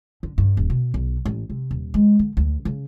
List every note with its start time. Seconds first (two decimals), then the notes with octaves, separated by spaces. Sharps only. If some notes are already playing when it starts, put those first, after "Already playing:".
0.23 D3
0.38 G2
0.57 D#1
0.70 B2
0.94 B1
1.25 A1
1.50 C3
1.71 D#1
1.94 G#3
2.19 D3
2.37 D2
2.65 C#3